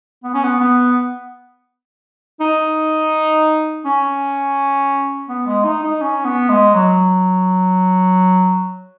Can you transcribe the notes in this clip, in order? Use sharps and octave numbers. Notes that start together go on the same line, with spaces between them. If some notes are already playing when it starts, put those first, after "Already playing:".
B3
C#4
B3
B3
D#4
C#4
B3
G#3
D#4
D#4
C#4
B3
G#3
F#3